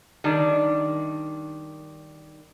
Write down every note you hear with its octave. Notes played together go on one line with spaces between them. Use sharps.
D#3 G3 D4